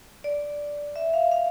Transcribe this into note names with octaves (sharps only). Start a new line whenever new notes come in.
D5
E5
F5
F5